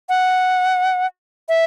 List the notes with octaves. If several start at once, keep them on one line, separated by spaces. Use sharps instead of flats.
F#5
E5